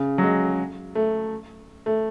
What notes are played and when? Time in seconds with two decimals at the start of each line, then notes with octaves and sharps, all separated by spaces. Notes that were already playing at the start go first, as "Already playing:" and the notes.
Already playing: C#3
0.18 F#3
0.23 G#3
0.95 A3
1.86 A3